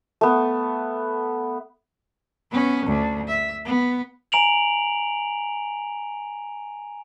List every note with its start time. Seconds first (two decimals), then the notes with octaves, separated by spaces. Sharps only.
0.21 A3 B3
2.51 B3 C#4
2.86 D2
3.28 E5
3.65 B3
4.32 G#5 A#5 D7 F7 F#7